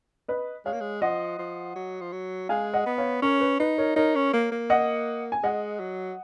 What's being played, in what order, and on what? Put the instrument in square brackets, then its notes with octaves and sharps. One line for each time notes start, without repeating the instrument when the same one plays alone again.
[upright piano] B4 D#5
[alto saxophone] G#3 [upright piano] C#5 F5
[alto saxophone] A#3
G#3
[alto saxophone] F3 [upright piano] D#5 F#5
[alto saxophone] F3
F#3
F3
F#3
[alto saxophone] G#3 [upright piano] F5 G#5
[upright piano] D#5 F#5
[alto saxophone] B3
[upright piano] C#5 F5
[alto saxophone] C#4 [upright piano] A#4 C#5
[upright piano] B4
[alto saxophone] D#4 [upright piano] B4
[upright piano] A#4 C#5
[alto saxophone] D#4 [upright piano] A#4 C#5
[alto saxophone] C#4
A#3
A#3
[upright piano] D#5 F#5
G#5
[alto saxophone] G#3 [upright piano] D#5 F#5
[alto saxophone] F#3